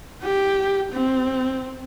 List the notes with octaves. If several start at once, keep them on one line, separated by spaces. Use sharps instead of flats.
G4
C4